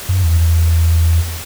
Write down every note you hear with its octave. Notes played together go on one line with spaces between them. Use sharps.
F#2
E2